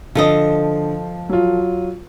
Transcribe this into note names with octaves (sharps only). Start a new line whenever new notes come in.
D3 F3 A4 D#5
F#3 F4